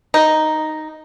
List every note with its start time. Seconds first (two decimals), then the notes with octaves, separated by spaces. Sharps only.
0.14 D#4